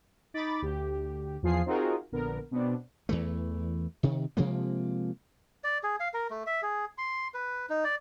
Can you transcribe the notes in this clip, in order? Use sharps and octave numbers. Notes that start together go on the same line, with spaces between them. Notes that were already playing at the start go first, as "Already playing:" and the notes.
D#4 B5 D6 A6
D2 G4
E2 F3 F4 G#4 C7
C4 D#4 F4 F#4 G#4 A#4
A#1 D3 B3 A#4
B2 B3 C4 D4
E2 E3 A3
C3 D#3
C3 F3 G#3 A#3
D5
G#4
F5
A#4
A3
E5
G#4
C6
B4
D#4
D5